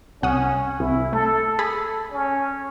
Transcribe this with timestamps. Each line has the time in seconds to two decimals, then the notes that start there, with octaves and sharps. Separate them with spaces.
0.22 C2 C#4 F#5 D#6
0.80 C2 E4
1.13 A3 A4
1.59 G#4 A4 B5 A6
2.12 C#4